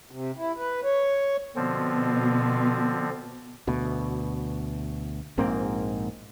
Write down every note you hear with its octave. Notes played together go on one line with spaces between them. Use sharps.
C3
E4
B4
C#5
B2 D3 F3 C4
D2 B2
A#1 G#2 A#3 C4